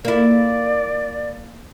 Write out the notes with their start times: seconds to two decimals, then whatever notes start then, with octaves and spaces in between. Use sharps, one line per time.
0.05 A#3 E4 D5